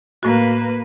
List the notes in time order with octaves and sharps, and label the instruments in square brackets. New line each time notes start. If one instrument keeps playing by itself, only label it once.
[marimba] A2 F#4 [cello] A#3 B4